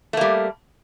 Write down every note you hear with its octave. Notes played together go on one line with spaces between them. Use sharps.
G3 A3 A#3